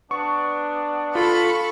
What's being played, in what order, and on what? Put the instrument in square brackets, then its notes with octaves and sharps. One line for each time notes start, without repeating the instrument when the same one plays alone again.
[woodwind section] B3 D4 [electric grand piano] C#6
[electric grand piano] F4 [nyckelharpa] A4 [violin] B5 C#6